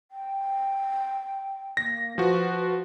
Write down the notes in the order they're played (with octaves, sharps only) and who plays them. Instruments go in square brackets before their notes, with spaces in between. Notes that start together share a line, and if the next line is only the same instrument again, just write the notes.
[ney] G5
[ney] A#3 [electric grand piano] A#6
[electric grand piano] F3 F#4 [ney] B4